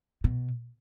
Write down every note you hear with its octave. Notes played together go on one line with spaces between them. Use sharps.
B2